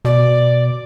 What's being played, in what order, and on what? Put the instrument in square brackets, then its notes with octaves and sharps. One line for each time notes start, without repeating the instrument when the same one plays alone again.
[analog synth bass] B2 [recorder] D5